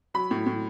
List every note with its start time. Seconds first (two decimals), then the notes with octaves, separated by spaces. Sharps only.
0.14 F#3 B5
0.31 A2
0.46 A2